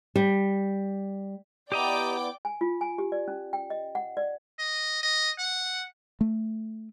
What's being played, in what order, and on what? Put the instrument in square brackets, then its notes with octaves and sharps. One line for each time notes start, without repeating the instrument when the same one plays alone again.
[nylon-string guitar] G3
[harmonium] B3 E4 [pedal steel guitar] G4 D#5 A#5 [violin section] D5 G5 D6
[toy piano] G#5
F4
G#5
G4
D5
C#4
G5
D#5
F#5
D5
[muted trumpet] D#5
D#5
F#5
[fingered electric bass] A3